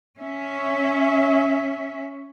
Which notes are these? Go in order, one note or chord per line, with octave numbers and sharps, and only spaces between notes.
C#4 E5